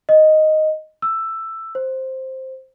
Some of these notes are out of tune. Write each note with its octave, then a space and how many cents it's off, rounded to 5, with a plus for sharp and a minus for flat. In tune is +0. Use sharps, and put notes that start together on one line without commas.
D#5 +0
E6 +10
C5 +5